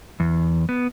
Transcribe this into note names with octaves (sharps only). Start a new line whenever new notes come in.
E2
B3